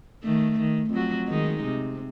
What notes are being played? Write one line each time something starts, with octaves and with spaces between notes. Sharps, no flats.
D#3 A3
D#3
F2 F#3 F#4
D#3 G#3 D#4
C3